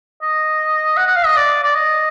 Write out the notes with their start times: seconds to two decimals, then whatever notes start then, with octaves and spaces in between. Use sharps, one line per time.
0.22 D#5
0.97 F#5
1.07 F#5
1.16 F5
1.26 D#5
1.36 D5
1.63 D5
1.74 D#5